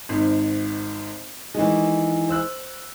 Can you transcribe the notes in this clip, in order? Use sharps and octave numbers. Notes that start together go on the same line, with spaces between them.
G#1 G#2
D#3 E3 G#3
C5 E6 F#6